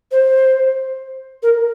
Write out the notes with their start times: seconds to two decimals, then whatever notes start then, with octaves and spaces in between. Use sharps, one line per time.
0.11 C5
1.43 A#4